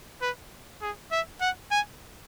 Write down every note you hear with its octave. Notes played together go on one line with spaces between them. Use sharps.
B4
G#4
E5
F#5
G#5